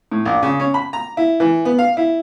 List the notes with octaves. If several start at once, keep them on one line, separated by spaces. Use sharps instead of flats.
A2
A#1
C#3
C#4
B5
A#5
E4
E3
B3
F5
E4